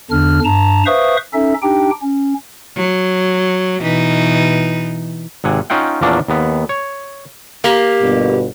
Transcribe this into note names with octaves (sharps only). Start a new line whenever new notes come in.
E2 D3 D4 F6
G2 A5 A#5
B4 C5 E5 F5 C#6 D#6
C#4 D#4 A4 E5
D4 D#4 G4 G5
C#4
F#3
B2 E3 D#4
G#1 C3 F#5 G#5
C#4 D#4 F4 F#5 G5
E2 A#2 F3 A#3 C#4 D4
D#2 B3
C#5
A#3 G4
G1 B2